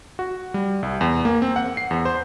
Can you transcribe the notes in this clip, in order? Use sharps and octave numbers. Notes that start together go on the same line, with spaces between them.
F#4
G3
C2
E2
A#3
C4
F#5
C7
E2
C5